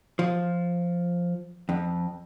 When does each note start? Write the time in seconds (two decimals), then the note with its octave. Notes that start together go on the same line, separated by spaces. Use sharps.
0.19 F3
1.69 F2